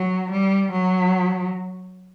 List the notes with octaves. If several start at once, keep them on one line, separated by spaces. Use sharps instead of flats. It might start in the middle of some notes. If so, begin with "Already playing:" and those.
Already playing: F#3
G3
F#3